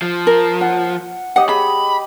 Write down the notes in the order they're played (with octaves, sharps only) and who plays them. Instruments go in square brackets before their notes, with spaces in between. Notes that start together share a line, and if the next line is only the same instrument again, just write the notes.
[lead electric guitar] F3
[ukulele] A#4
[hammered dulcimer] F#5
[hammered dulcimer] G4 D#5 [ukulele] F#5
[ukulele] G#4 [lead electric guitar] B5